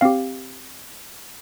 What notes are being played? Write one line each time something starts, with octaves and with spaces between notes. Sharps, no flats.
C4 G4 F5